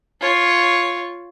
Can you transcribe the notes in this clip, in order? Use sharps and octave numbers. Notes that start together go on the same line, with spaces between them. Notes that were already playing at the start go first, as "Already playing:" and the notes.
F4 C#5